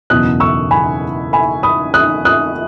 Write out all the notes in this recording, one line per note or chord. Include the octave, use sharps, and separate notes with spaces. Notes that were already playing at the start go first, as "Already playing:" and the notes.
F#1 E2 B2 D#6 F#6
C#6 E6
G#5 B5
G#5 B5
B5 D#6
D#6 F#6
D#6 F#6